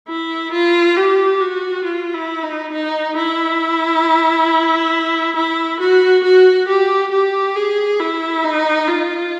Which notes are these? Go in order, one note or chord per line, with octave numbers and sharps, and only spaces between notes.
E4
F4
G4
F#4
F4
E4
D#4
D#4
E4
E4
F#4
F#4
G4
G4
G#4
E4
D#4
F4